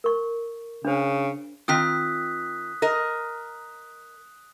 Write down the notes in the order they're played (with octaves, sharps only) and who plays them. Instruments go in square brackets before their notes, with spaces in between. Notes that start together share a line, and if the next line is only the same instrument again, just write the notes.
[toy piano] A#4 C#6
[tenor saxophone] C#3 [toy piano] D4 C5
[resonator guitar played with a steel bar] D#3 C4 F4 [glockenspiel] D#6 F#6 B6
[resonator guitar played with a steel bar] A#4 D#5